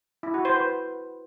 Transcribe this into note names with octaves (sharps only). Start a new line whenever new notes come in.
E4
F#4
C5
B4